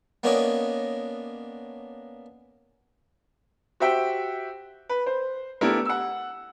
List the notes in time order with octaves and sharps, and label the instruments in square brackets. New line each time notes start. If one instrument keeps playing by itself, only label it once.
[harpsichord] A#3 B3 C#4 D4 C#5 D#5
[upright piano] F#4 G4 C5 E5 G5
B4
C5
A3 B3 D4 E4 G4 A#4
F#5 E6